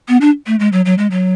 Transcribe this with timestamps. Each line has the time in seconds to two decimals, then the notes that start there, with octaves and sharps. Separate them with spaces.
0.08 B3
0.21 D4
0.47 A3
0.60 G#3
0.72 F#3
0.85 F#3
0.98 G#3
1.11 F#3